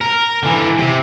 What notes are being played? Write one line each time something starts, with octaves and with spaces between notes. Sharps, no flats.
A#4
D3 E3
C3